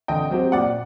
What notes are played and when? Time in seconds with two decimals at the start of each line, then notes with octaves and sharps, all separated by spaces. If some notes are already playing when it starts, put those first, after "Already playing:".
0.08 D3 D#5 G5
0.30 F#3 C4 G4
0.52 A#2 D5 F#5